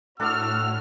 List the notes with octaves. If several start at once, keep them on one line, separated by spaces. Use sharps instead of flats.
A2 D4 F#4 A4 D5 E6 F6